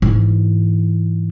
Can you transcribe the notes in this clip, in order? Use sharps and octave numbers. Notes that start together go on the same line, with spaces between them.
G#2 E3